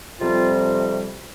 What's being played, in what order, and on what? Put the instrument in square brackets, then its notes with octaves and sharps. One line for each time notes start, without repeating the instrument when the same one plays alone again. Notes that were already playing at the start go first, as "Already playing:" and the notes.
[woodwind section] F2 C3 G3 C4 F4